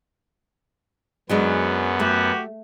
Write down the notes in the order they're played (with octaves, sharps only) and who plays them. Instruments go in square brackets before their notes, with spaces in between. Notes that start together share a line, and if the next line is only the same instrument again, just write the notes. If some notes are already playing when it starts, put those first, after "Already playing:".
[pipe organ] F#2 B3 [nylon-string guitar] F#3 G#3 D4
[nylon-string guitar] A3 [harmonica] F#4 G4